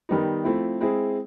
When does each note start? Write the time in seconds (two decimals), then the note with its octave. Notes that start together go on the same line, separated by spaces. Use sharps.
0.09 D#3 G3 B3 D#4
0.44 F3 A3 C4 E4
0.81 G#3 C4 E4 G#4